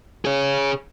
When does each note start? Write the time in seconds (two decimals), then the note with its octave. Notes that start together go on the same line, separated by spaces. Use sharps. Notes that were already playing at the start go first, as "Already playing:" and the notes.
0.25 G#4 C#5